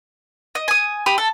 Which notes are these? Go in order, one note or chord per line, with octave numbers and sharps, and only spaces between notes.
D#5
G#5 D#6
G4 B5 D#6
A4